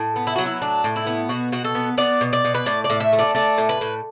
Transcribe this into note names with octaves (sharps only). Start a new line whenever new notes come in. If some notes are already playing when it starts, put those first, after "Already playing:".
Already playing: A2
B3
E4
F#3 F#4
E4
A2 D4
A2
E4
B3
B2 F#4
B2 F#4
A4
B3
B3 D5
B2
D5
B2
B4
A2 D5
D5
A2
E5
A3
D5
A3 D5
A2
B4
A2